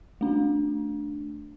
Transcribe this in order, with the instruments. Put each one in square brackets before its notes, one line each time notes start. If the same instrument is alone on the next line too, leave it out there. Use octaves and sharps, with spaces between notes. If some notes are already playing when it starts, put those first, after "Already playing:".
[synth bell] A3 D4